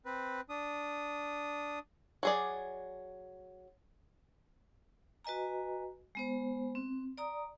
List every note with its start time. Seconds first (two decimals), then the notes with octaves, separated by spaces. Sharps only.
0.06 C4 B4
0.49 D4 D#6
2.23 F#3 G#4 D5
5.25 F#4 B4 D#5 G#5 A#5
6.15 G#3 B3 C5
6.75 C4
7.18 D5 A#5 D#6